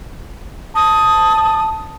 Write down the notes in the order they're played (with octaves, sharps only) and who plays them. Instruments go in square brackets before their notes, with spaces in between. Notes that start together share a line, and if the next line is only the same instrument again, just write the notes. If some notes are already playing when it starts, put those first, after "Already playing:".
[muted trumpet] A5 [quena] D#6